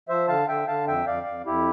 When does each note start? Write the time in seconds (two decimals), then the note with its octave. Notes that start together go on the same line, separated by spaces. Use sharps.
0.09 F3 C5 E5
0.28 D3 F5 A5
0.48 D3 E5 G5
0.67 D3 F5 A5
0.87 F2 E5 G5
1.07 F2 D5 F5
1.26 F2
1.46 F2 E4 G4